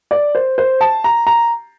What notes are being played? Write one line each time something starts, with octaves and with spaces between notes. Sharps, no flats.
D5
C5
C5
A5
A#5
A#5